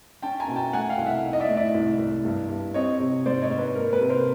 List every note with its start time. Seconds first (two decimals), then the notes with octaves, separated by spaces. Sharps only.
0.22 C#4 G5 A5
0.40 G#5 A#5
0.48 B2
0.56 G5 A5
0.73 A3 F#5 G#5
0.89 F5 G5
0.98 C2
1.06 E5 F#5
1.24 D#4
1.33 D#5
1.40 D5 E5
1.48 A2
1.57 D5 E5
1.74 C2
1.99 C2
2.25 G2
2.49 G2
2.74 C4 C#5 D#5
3.00 C3
3.26 G#2 C5 D5
3.42 C#5 D#5
3.50 G#2
3.59 B4
3.75 A#3 A#4
3.93 B4
4.01 C3
4.09 A#4 C5